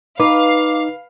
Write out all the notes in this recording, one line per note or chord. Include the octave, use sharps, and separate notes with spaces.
D#4 B4 F5 D6